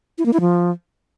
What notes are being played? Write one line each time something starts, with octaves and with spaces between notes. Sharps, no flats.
E4
A#3
E4
F3